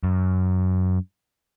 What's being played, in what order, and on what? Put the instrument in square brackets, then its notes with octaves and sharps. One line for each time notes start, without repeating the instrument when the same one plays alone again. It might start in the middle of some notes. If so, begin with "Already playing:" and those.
[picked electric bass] F#2